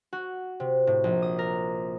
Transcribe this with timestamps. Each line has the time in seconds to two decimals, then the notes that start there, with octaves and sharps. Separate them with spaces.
0.13 F#4
0.60 C3
0.87 A2
1.04 A#1
1.22 D#6
1.39 A#4